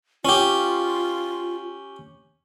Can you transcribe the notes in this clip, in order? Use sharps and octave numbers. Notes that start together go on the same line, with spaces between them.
C#4 F4 G4